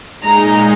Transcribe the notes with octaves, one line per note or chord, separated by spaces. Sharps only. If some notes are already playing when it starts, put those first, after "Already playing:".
A#2 G#3 D#4 A#5